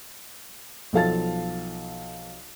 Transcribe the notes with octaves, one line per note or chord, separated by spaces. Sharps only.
B1 F3 A4 F5 A5 A6